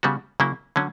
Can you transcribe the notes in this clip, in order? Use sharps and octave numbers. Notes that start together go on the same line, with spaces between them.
C#3 G3 B3 F#4
C#3 F#3 A#3 E4
D3 F#3 C#4